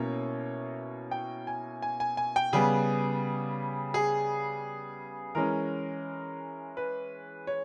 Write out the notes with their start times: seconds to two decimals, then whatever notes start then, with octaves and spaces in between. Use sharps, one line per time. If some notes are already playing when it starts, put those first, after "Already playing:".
Already playing: B2 A#3 C#4 E4 C#5
1.11 G5
1.47 G#5
1.82 G#5
2.00 G#5
2.17 G#5
2.36 G5
2.53 C#3 G3 B3 G#4
3.94 G#4
5.35 E3 G#3 C#4 A#4
6.77 B4
7.47 C#5